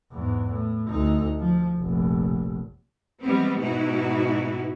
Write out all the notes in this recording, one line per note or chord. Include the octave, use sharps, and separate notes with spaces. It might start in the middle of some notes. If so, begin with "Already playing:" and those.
E2 G#2
A2
D2 D#4
F3
F1 A#1
E3 G3 G#3 B3 C4
G#2 B2 D#4 E4 F#4